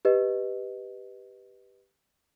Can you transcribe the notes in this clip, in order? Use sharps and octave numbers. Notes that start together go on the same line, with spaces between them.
G4 B4 D#5